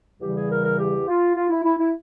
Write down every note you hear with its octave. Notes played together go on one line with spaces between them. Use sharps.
E2 C#3 E3 G3 G4
G#4
A#4
A#4
G4
F4
F4
E4
E4
E4